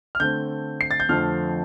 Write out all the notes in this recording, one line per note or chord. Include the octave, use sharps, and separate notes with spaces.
F6
D3 A3 C4 G6
C7
A6
G6
F2 D3 F3 A3 C4 F6